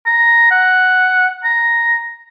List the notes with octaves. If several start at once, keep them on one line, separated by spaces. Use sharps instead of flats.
A#5
F#5
A#5